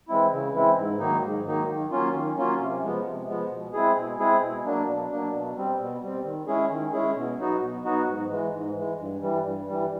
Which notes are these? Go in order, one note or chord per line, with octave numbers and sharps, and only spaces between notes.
E3 G#3 C4 E4
C#3
E3 G#3 C4 E4
G#2
D#3 F#3 A#3 D#4
G#2
D#3 F#3 A#3 D#4
D#3
F#3 A#3 C#4 F4
D#3
F#3 A#3 C#4 F4
C3
F3 G#3 B3
C3
F3 G#3 B3
B2
G#3 C4 E4 G#4
B2
G#3 C4 E4 G#4
B2
F#3 A#3 D4
B2
F#3 A#3 D4
B2
G3 C4
B2
G3 C4
D#3
G#3 C#4 E4 G#4
D#3
G#3 C#4 E4 G#4
B2
F#3 B3 D#4 F#4
B2
F#3 B3 D#4 F#4
G#2
E3 G#3
G#2
E3 G#3
G2
E3 G3
G2
E3 G3